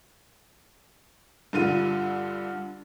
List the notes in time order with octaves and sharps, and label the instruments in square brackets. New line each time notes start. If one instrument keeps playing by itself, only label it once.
[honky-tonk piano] G2 D3 F4 D#7